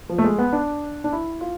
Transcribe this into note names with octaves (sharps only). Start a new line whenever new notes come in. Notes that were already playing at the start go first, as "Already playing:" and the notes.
F3
A3
G#3
B3
D4
D4
E4
F4